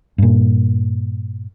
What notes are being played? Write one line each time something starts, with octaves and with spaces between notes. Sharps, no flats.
G2 A#2